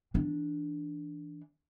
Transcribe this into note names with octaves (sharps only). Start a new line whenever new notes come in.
E3 D4